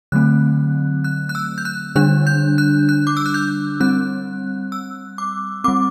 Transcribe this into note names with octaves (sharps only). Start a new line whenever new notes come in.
D3 F#3 A3 C4 F#6
F#6
F#6
E6
G6
F#6
D3 G3 D4 F#6
G6
F#6
F#6
D6
E6
F#6
G6
G3 C4 F#6
E6
D6
G3 C4 D6